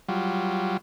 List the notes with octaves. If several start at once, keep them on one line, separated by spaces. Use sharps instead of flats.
F#3 G3 F4